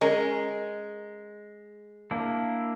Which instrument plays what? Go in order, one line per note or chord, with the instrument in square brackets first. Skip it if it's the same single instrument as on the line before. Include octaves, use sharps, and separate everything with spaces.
[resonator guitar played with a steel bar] G#3 [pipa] C#4 A#4 G#5
[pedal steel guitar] A#3 D4 E4